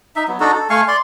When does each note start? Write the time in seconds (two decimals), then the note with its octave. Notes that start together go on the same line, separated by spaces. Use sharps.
0.16 D#4 E5
0.28 F#3 B3
0.40 D4 D#4 F#4 A4
0.54 A4
0.70 A3 F5 G#5 C#6
0.88 D5 C6